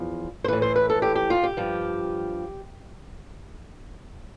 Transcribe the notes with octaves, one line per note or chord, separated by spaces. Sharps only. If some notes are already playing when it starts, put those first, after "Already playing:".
Already playing: E2 F3
C5
A2 E3 B4
C5
B4
A4
G4
G4
F4
G4
G2 F3